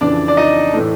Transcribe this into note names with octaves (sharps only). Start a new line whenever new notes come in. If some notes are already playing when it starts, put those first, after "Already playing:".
F2 C#3 E3 D4 D5
D5
D#4 D#5
A2 E3 A3